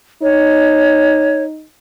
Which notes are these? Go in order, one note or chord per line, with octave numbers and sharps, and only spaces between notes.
D#4 C#5